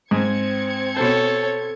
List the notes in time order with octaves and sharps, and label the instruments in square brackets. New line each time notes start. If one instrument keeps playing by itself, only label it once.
[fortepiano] G#2 [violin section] C4 G#6 C#7
[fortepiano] B2 C5 [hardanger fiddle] A4 C#5